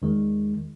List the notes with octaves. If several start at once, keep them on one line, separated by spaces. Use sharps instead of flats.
E2 D#3 G#3